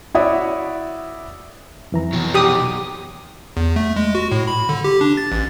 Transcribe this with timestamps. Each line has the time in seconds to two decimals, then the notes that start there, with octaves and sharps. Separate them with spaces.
0.15 E4 F#4 C#5 D5 E5 D#6
1.92 F2 E3 A#5
2.13 B2 F#3
2.35 G4 D#6
3.57 E2
3.76 A3
3.96 G#3
4.15 F#4
4.32 A2
4.47 B5
4.69 D3
4.84 G4
5.01 D4
5.17 A6
5.32 A1